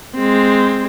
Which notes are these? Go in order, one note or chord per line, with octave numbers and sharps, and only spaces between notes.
G#3 C4